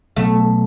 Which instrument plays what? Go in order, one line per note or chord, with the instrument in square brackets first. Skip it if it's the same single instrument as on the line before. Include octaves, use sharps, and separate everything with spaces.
[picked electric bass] B2 F#3 B3 [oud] A3